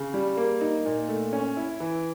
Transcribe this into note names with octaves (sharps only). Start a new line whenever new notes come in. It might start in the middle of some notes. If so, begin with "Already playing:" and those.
Already playing: C#3
G3
A#3
D#4
A#2
A3
C#4
E4
E3